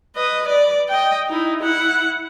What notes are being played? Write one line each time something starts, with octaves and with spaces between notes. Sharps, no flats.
B4 D#5
D5
D#5 G5
D#4 E4
E4 F#5